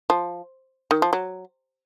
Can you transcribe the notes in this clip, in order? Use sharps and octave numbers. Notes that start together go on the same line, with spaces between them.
F3
D#3
F3
F#3